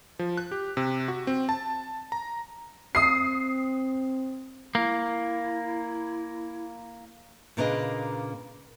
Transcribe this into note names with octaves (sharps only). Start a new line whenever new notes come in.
F3
F#6
G4
C3
F#4
C4
A5
A#5
C4 D#6 C7
A#3 E4
A#2 C#3 A#3 D4 B4 D#5